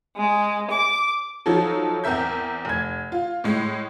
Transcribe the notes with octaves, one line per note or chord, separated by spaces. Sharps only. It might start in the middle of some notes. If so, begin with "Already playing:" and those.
G#3
D6
F3 F#3 D#4 A4
E2 C4 A#4 E5 G6
F1 G#6
F4
A2 G#3